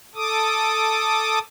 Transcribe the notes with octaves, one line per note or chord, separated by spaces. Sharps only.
A4 D6 D#6